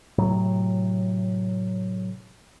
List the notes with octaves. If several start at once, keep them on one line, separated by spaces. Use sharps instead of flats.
A2 C3 F#3